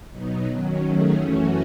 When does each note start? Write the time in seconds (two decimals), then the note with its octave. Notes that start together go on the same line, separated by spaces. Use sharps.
0.11 B2 F#3 B3 D#4
0.46 D#3 F#3 C#4
0.80 D#3 F#3 A3 C#4 G#4
1.15 F#2 E3 A3 C#4 F#4